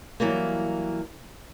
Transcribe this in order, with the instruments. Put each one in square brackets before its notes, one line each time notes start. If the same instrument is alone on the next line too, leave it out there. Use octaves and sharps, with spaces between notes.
[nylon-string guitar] E3 F#3 G3 A#3